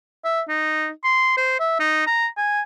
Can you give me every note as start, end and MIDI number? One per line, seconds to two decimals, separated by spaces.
0.24 0.41 76
0.49 0.90 63
1.04 1.37 84
1.37 1.55 72
1.60 1.77 76
1.80 2.06 63
2.07 2.27 82
2.37 2.61 80